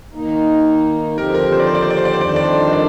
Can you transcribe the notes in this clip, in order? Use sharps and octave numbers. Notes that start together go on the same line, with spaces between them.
D#3 A#3 D#4
D#2 D3 F3 C4 G4 A#4
A#4
C5
D5
C5
D5
C5
D5
C5
D5
C5
F2 D#3 G3 D4 D5
C5
D5
C5
C5
D5